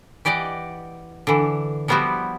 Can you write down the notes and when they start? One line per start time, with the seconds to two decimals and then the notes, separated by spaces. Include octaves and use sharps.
0.25 E3 G4 D5 D#5 F#5
1.27 D3 E3
1.88 F3 G3 B3 E4 F#4 G4